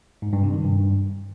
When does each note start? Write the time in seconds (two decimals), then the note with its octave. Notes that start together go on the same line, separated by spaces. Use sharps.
0.22 G#2
0.33 G2
0.43 C3
0.54 D#3
0.65 G2